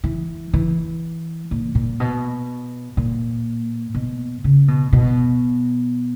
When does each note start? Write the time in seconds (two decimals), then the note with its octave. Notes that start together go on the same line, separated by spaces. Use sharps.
0.04 E3
0.53 E3
1.51 A#2
1.75 A#2
2.00 B2
2.97 A#2
3.95 B2
4.44 C#3
4.68 B2
4.93 B2